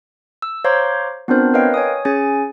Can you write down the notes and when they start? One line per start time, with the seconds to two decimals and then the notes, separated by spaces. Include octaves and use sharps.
0.42 E6
0.65 C5 C#5 F5 A#5 C6 D6
1.28 B3 C4 D4 F4 A#4 C5
1.54 A#4 B4 C#5 D#5 F5 G5
1.74 C#5 G#5 D#6
2.05 C#4 G#4 G#5 A6